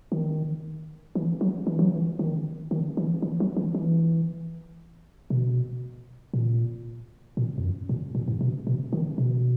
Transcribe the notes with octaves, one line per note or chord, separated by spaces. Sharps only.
D#3
E3
F#3
E3
F#3
E3
D#3
D#3
E3
E3
F#3
E3
E3
B2
A#2
A#2
E2
F#2
A#2
A#2
G#2
B2
B2
D#3
B2